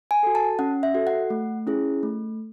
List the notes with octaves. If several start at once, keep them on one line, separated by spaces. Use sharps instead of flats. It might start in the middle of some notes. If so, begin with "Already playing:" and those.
G#5
F#4 A4
A5
C#4 F#5
E5
F#4 A4
F#5
A3
C#4 E4 G#4
A3